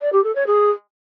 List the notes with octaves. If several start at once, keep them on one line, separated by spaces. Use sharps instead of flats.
D5
G4
A4
C#5
G#4